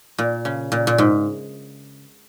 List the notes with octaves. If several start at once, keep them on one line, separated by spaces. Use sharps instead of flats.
A#2
C#3
A#2
A#2
G#2